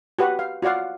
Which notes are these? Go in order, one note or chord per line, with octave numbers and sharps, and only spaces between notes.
F#4 G4 B4 F#5
F5
F4 F#4 D5 F5 F#5